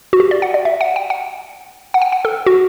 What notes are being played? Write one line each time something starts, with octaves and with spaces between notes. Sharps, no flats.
F#4
G4
D5
F#5
D5
E5
F#5
G5
F#5
F#5
G5
F#5
A4
F#4